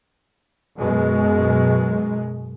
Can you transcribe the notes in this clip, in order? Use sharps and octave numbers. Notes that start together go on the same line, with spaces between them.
F#2 B2 G#3